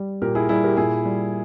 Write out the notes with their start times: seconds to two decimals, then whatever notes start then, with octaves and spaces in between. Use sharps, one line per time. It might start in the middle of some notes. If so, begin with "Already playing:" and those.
Already playing: G3
0.22 A#2 G4 A#4
0.35 E4 G#4
0.49 G3 E4 G#4
0.64 G4 A#4
0.77 A#2 E4 G#4
1.05 G3